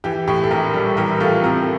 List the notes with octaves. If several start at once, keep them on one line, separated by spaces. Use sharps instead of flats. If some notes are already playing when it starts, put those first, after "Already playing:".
E3 G4
A2 G4
A4
A#1 G4 A#4
G3
E3 G4 A#4
A2 F4 A4
C3 G4 A#4